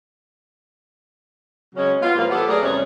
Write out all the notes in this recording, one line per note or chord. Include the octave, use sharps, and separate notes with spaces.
C#3 F#3 G#3 C#4
B3 F4
A2 E3 F3 G3 A#3
B3 G4 A4
F#3 A3 G#4 A#4 D5
E2 C3 G3 C#4 B4 C#5